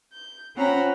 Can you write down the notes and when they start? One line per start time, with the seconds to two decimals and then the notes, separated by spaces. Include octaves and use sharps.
0.13 G6
0.56 C4 C#4 F4 F#5 A#5 B5